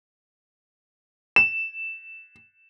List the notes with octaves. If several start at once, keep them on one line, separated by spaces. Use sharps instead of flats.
E7